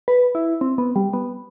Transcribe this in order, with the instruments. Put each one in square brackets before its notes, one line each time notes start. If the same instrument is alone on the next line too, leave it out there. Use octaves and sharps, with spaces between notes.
[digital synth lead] B4
E4
C4
B3
G3
B3